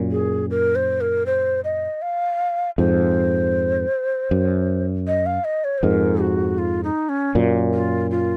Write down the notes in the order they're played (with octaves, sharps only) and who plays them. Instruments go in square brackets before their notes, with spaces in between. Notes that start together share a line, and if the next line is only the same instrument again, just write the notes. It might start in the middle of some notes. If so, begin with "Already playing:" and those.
Already playing: [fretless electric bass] F#2 A#2
[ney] G#4
A#4
C5
A#4
C5
D#5
F5
[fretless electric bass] F2 G#2 [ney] C5
[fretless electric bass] F#2
[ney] D#5
F5
D#5
C#5
C5
[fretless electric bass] F2 G#2 [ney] A#4
[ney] F#4
F4
D#4
C#4
[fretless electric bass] F#2 A#2
[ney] F4
F4